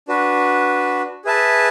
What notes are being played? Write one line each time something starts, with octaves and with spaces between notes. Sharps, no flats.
D4 F#4 B4
G#4 B4 E5 A5